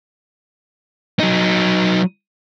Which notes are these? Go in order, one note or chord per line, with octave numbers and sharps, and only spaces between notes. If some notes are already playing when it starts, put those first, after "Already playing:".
F#3 D#4